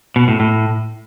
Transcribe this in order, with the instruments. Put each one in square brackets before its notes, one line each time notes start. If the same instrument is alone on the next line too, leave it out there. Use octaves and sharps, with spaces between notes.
[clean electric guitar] B2
A2
A2